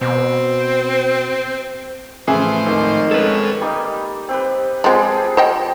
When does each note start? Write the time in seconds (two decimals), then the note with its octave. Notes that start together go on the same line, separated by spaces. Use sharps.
0.01 B2 C4
2.27 A2 C#3 E3 F3 G#4 C5
2.66 G#1 D#3
3.11 G#3 C#4 A4 B4
3.61 G3 A#3 D#4
4.29 C4 G4 B4
4.84 F3 G3 G#3 C4 G#4
5.37 C5 D#5 G5